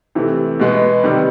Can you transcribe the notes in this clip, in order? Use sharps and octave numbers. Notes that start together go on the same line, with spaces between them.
C3 E3 A3
B2 G#3 B3
C3 D#3 G3 B3